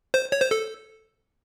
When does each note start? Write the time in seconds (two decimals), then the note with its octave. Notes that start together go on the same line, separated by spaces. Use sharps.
0.14 C5
0.32 C#5
0.41 C5
0.51 A4